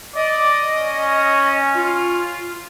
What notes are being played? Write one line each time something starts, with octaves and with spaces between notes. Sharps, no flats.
D5 D#5
C#4
F4